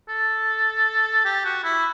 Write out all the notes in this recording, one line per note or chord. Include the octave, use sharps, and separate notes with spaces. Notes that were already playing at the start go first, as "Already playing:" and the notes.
A4
G4
F#4
E4